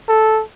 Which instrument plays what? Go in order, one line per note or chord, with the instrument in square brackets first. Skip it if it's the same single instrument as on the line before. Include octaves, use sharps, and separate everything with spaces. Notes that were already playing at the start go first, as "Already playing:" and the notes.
[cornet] A4